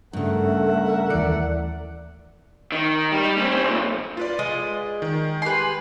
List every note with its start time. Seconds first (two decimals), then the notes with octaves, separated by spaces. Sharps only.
0.13 G2 C#3 A3 A#4 E5 F#5
1.10 D#2 E3 D5 C#7
2.72 D#3
3.12 G3
3.37 C4 C#4
3.63 B1 A#2
4.17 F4 B4 D5
4.39 G#3 D#5
5.02 D#3
5.42 G4 B4 G#5 C6